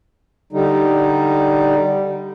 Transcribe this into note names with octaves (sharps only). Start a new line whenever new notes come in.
D3 G3 D#4